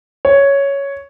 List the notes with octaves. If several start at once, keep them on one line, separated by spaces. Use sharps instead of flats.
C#5